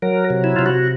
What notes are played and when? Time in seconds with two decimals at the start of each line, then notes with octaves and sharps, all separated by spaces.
0.02 F#3 A#4
0.30 C3
0.44 E4
0.56 C3 F4
0.66 F#4